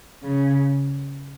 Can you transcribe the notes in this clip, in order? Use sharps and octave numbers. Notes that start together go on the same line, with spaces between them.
C#3